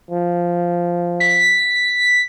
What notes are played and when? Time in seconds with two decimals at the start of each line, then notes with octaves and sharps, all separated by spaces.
0.11 F3
1.20 B6